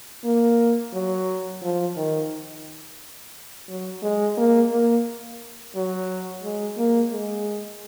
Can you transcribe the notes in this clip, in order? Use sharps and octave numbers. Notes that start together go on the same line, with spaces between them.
A#3
F#3
F3
D#3
F#3
G#3
A#3
A#3
F#3
G#3
A#3
G#3